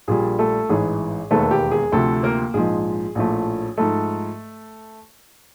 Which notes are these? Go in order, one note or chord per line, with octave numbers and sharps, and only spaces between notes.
A#1 A#2 G3 G#4
A3 A4
A1 G#2 E3 G#4
E1 D#2 D#3 G#3 A3 B3 A4
G4
G#4
D2 C3 F3 A3 A4
A#3 A#4
A#1 G#2 F3 G#3 G#4
A#1 A2 F3 A3
G#2 F3 A3 A4